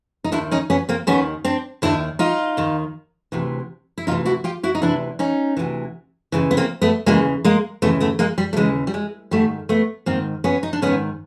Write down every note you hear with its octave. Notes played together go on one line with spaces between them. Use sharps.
D#4
D#2 D#3 D4 E4
C#4 D#4
B3 C#4
A#3 C4
D#2 D#3 B3 C#4
C4 D4
D#2 D#3 D4 E4
D#4 F4
D#2 D#3
D2 C3 E3
E4
D2 C3 E3 D#4 F4
E4 F#4
F4 G4
E4 F#4
D#4
D2 C3 E3 D4 E4
C#4 D#4
D2 C3 E3
D#2 C#3 E3
B3
A#3 C4
A3 B3
D#2 C#3 E3 G#3 A#3
G#3 A#3
D#2 C#3 E3 A3 B3
A3 B3
G#3 A#3
G3
A3
D#2 C#3 E3 G#3
G3
G#3
G#2 D#3 G3 A3
A3 B3
G#2 D#3 A#3 C4
B3 C#4
D#4
D4
G#2 D#3 B3 C#4